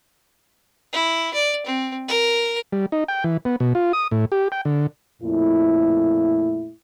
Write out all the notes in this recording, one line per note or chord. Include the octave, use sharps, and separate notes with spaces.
E4
D5
C4
A#4
G3
D#4
G5
E3
B3
B2
F4
D#6
A2
G4
G5
D3
F2 A#2 A3 E4